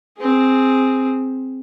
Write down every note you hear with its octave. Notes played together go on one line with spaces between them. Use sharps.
C4 G#4